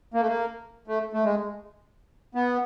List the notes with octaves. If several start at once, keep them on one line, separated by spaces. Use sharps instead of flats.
A#3
A3
A#3
A3
A3
G#3
B3